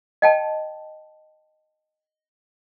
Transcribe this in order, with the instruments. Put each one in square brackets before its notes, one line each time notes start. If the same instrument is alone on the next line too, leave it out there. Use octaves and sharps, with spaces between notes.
[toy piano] D#5 G5 A5